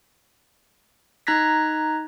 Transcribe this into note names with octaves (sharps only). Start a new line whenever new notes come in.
D#4 A#5 F#6 G#6 A#6 B6